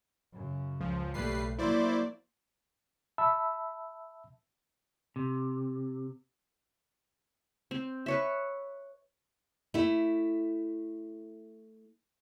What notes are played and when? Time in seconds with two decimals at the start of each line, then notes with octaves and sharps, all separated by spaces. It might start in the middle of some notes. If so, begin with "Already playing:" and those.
0.33 F#2 C#3
0.80 C#2 F3
1.14 B1 G3 A3 B4 C7
1.58 F#3 A#3 E4 C5 D5
3.18 E5 A5 B5 E6
5.16 C3
7.71 C4
8.06 B4 C#5 E5
9.74 A3 E4